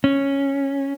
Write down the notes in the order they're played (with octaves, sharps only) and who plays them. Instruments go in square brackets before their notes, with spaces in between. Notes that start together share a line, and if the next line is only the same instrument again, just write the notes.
[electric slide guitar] C#4